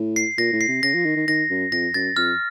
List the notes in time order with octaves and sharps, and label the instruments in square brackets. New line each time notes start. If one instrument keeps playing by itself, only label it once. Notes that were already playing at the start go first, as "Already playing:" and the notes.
Already playing: [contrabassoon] A2
[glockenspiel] C7
[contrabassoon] A#2 [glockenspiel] A#6
[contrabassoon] A2
[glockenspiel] C7
[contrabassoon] C3
[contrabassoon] C#3 [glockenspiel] A#6
[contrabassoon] F3
D#3
D#3
[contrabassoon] D#3 [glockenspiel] A#6
[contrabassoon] F#2
[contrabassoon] F2 [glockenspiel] A#6
[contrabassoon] F#2 [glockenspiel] A6
[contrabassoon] F2 [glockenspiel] F6